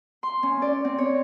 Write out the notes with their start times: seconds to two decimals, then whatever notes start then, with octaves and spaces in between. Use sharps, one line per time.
0.23 C6
0.43 C#4
0.62 D5
0.85 C4
0.98 C#5